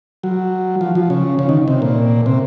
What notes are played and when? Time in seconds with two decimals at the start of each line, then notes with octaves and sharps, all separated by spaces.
0.23 F#3
0.81 F3
0.95 F3
1.10 C#3
1.39 C#3
1.49 D#3
1.68 C3
1.82 A#2
2.26 C3